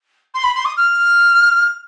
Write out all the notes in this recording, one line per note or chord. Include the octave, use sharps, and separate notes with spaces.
C6
B5
C6
D#6
F6